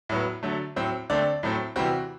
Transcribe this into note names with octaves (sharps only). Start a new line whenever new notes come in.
A2 F#3 B3
D3 F#3 A3
A2 F#3 C4
D3 A3 C4 D5
A2 F#3 A3 C4
C3 E3 G3 C4 F#4